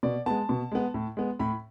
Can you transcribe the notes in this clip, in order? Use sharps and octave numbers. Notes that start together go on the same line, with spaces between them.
B2 D5
G#3 B3 A5
B2
G#3 B3
A2
G#3 B3
A2 B5